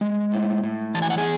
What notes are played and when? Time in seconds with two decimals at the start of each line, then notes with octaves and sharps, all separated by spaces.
0.01 G#3
0.32 A2
0.63 A2
0.94 E3 A5
1.02 G#5
1.10 F#5
1.18 G#4 G#5